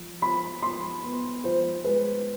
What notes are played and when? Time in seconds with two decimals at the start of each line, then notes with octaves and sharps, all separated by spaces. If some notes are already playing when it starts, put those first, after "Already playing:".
Already playing: F3
0.21 F3 B5
0.62 F3 C6
1.04 B3
1.44 F3 C5
1.84 G#3 B4